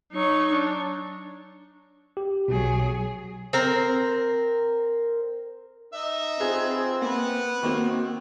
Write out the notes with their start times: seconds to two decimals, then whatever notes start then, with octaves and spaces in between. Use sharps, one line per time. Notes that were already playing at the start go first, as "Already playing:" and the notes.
0.13 F#3 D#4 C#6
0.52 D4
2.17 G4
2.48 B1 B2 F#3 G#4
3.53 C4 A#4
5.93 D#4 E5
6.40 C4 F4 G#4 B4
7.01 A#3 B3 B4 F#5
7.63 D#3 A#3 C4 F#4